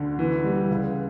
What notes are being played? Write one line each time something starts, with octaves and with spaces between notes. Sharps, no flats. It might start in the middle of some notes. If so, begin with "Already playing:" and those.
Already playing: D2 D3
E3
G3
C#2